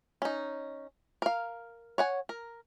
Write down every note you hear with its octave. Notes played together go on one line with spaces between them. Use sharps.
C#4 D#4
A#4 F5
C#5 F#5 G#5
A#4